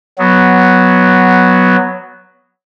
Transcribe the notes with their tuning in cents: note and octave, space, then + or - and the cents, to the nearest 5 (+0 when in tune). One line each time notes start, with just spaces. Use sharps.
F#3 +0 B3 +0